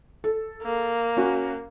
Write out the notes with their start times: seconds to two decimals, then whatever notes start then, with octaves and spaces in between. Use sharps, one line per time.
0.24 A4
0.63 A#3
1.17 C#4 F#4